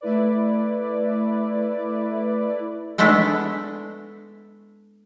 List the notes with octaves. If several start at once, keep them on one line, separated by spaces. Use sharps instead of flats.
A3 E4 B4 D5
G#3 A3 B3 D4 E4